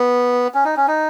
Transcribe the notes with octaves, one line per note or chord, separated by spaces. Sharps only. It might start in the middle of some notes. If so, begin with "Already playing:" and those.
Already playing: B3
C#4
D#4
C#4
D#4